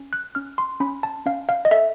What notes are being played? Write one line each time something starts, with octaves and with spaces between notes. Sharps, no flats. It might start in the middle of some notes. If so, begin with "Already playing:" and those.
Already playing: C#4
F#6
C#4 F6
C6
C#4 B5
A5
C#4 F5
F5
D#5
A4 E5